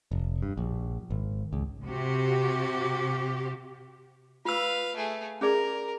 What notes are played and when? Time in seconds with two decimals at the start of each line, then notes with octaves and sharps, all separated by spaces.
0.11 F1
0.42 G2
0.57 A#1
1.11 G#1
1.53 C#2
1.83 C3 F#4 G4
4.45 F4 B4 F5 E6
4.96 A3 G#4
5.41 C#4 G#4 A#4 D5